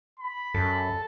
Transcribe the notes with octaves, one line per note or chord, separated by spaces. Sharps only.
B5
F#2 A4